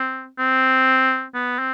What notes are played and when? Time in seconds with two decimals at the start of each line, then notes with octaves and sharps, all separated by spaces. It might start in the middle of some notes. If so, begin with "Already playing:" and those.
Already playing: C4
0.39 C4
1.34 B3
1.59 C4